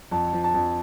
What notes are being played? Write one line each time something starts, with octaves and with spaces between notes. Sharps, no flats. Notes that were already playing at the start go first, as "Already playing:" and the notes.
F2 A5
F3
A5
F2